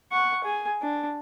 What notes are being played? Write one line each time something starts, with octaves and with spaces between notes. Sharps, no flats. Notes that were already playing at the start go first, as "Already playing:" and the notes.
F#5 C#6
G#4 G#5
D4